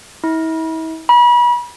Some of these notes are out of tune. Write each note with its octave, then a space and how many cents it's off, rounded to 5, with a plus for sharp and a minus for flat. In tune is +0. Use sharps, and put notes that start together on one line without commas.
E4 -40
B5 -35